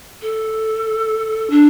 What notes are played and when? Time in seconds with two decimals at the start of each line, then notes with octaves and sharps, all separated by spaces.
0.21 A4
1.50 D4